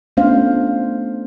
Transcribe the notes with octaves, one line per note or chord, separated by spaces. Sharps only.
A3 B3 C#4 D4 C5 F5